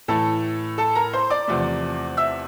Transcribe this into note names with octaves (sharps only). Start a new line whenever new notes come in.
A2 E3 A3 A4 A5
A4 A5
A#4 A#5
C5 C6
D5 D6
E2 C3 F3 A3
E5 E6